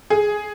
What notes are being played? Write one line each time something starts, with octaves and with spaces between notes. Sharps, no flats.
G#4